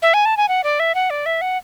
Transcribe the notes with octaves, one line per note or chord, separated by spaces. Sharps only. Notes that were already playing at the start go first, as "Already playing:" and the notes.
E5
G#5
A5
G#5
F#5
D5
E5
F#5
D5
E5
F#5